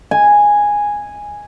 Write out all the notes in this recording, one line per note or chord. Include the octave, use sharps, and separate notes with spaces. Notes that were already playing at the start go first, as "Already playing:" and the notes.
G#5